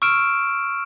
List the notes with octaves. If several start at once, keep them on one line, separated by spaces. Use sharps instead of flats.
C#6 E6 F6 D7 E7